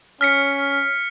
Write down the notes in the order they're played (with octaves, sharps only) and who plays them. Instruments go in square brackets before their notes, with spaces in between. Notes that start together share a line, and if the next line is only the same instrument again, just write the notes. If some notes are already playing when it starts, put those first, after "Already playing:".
[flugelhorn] C#4 [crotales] F6 B6 C#7